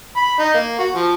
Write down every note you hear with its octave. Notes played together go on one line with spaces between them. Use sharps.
B5
D#4
A#3
F#4
F3